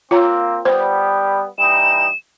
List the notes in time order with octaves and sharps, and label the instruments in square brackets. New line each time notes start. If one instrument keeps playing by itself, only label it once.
[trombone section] A#3 C4 [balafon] F4 C#5 A#5
[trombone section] G3 B3 [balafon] C5
[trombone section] E3 G3 D#4 [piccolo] E7